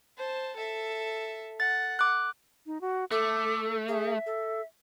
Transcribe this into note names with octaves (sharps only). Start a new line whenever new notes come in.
C5 A5
A4 E5
F#5 A6
D6 F#6
D#4
F#4
A3 A4 D6
G#4 E5
A4